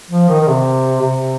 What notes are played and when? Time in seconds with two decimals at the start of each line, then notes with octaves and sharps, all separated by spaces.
0.10 F3
0.29 D#3
0.41 D#3
0.47 C3
1.01 C3